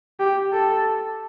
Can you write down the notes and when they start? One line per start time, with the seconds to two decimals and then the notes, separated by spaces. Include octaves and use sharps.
0.20 G4
0.53 A4